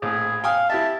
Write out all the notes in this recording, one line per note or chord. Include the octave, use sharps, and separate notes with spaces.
A#1 A2 G#4
F5 G5 G#5 D#6
E4 G4 E5 A5